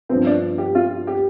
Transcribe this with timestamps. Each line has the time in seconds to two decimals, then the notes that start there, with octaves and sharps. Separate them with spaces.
0.09 G2 F3 B3 C4
0.27 D4
0.58 G4
0.75 F4
1.07 G4